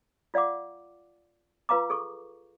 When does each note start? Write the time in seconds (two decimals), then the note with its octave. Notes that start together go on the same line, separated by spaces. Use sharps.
0.34 F4 D5 F5 F#5 D6
1.69 F4 B4 F5 A#5 D6
1.90 G#4 A4 C#6